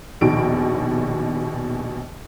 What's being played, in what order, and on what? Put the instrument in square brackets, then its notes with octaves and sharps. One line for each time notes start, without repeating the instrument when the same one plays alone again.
[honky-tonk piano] A#1 D#2 B2 D#4 D7